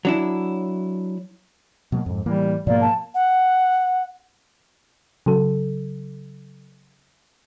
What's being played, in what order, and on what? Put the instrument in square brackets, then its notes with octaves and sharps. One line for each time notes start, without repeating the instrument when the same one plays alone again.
[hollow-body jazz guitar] F#3 D4 E4
[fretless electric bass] B2 F#3 A#3
F2 G#2
[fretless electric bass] A2 E3 A#3 [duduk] G3
[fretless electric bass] G#2 B2 F3 [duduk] A#3 [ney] D5
[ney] A5
[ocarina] F#5
[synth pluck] C#3 F#3 A4